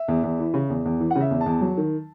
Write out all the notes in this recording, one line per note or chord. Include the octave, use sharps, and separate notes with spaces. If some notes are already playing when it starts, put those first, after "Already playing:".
Already playing: E5
E2
E2
E3
C#3
E2
E2
E3
F#5
C#3
E5
E2
A5
E2
F#3
D#3